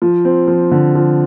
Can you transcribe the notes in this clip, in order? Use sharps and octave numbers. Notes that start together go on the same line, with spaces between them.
F3
C4
F3
D3
F3